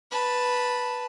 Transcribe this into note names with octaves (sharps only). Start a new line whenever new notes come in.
B4 A5